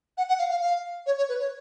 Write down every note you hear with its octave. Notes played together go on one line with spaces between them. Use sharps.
F#5
F#5
F5
F5
F5
C#5
C#5
B4
C#5